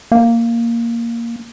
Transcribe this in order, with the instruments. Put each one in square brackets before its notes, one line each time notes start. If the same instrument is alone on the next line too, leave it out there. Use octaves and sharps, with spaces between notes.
[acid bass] A#3